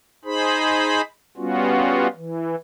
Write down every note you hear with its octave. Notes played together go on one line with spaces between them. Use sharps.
D#4 G#4 C5 B5
G3 B3 C#4 F4 F#4
E3